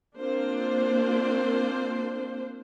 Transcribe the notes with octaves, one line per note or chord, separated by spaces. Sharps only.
A#3 C4 D4 F4 C5